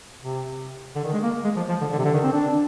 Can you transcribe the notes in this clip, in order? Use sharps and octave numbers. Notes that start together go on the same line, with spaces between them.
C3
D3
D#3
G#3
A#3
G#3
F3
F3
D3
D3
C3
D3
D#3
C4
D4